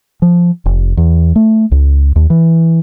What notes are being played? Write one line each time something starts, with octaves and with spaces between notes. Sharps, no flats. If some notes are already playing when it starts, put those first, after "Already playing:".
F3
F1
E2
A3
C#2
D#2
E3